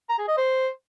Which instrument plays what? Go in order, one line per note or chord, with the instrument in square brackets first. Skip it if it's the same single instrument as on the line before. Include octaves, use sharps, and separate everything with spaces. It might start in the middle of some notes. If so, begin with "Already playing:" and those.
[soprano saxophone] A#5
G#4
D#5
C5